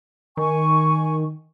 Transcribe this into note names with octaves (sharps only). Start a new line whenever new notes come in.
D#3 G#5 C#6